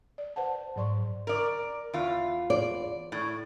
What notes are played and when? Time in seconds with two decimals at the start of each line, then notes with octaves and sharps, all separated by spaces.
0.18 D5
0.36 B4 C5 F#5 A5
0.76 G#2 F#3 D5 C6 C#6
1.27 A#4 D5
1.94 E2 F4
2.50 D5
3.12 A2